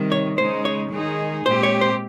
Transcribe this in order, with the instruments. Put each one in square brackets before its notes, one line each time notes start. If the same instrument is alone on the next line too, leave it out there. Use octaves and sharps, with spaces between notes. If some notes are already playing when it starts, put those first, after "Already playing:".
Already playing: [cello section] C3 D#3 G3
[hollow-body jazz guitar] C#5
[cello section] C#3 G#3 D#4 [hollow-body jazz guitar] C5
[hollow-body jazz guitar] C#5
[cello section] D#3 G#3 D#4 G#4
[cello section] A#2 G#3 C4 G4 [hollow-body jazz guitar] C5
[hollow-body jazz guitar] C#5
C5